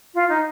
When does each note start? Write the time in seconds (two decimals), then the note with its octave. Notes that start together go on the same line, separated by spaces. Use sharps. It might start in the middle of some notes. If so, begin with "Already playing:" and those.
0.14 F4
0.29 D#4